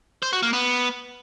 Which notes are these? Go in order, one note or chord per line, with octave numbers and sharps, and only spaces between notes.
C5
F#4
A#3
B3